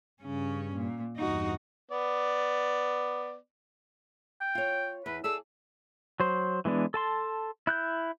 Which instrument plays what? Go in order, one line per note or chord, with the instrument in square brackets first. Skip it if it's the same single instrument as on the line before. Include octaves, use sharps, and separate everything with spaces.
[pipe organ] G2 [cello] C#3 C#4
[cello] A#2
[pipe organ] E2 G2 [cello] D#4 F#4
[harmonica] B3 D5
[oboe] G5
[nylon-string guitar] F4 C#5
[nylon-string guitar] E2 [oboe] B4
[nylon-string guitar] G#4 A4 D5 [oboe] E6
[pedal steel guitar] F#3 C5
E3 G#3 B3 D4
A4 A5 C6
E4 F#6 G6